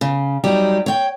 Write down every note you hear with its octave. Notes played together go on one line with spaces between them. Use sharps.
C#3
F#3 G3 D#4 G4
C#5 G5